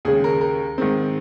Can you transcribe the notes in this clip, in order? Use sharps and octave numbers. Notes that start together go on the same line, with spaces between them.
D#2 C#3 G#3 G#4
A#4
A#4
G#2 D#3 G#3 C4